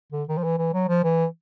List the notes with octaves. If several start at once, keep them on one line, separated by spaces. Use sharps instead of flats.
D3
D#3
F3
E3
E3
F#3
F3
E3